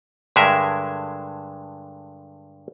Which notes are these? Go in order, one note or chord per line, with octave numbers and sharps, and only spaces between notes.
G2 D3 G#3 G#4 A#4 E5